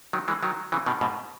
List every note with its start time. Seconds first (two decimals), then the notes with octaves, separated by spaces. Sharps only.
0.13 D#3 F#3
0.28 E3 G#3
0.43 D#3 F#3
0.72 C#3 E3
0.86 B2 D#3
1.01 G#2 B2